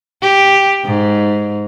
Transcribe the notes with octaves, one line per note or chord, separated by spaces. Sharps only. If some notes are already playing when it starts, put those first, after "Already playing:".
G4
G#2